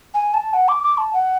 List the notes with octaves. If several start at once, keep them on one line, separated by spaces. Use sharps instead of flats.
G#5
A5
F#5
D6
D6
A5
F#5